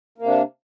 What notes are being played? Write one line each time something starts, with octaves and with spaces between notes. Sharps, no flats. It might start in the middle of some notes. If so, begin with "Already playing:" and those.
C3 A#3 D4